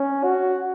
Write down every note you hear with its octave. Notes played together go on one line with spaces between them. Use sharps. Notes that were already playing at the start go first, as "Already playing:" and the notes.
Already playing: C#4
F#4